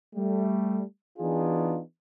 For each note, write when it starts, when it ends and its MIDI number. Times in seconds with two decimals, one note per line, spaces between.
0.15 0.82 55
0.15 0.82 57
1.19 1.80 52
1.19 1.80 59
1.19 1.80 62
1.19 1.80 63
1.19 1.80 65
1.19 1.80 68